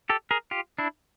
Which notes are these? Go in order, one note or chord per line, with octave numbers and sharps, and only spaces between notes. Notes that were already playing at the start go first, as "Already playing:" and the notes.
G4 A4
G#4 A#4
F4 G4
D4 E4